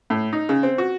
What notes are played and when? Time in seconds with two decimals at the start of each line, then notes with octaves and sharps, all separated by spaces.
0.10 A2
0.33 D#4
0.49 C#3
0.63 C4
0.78 F#4